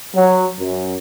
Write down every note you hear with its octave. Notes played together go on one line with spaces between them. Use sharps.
F#3
F#2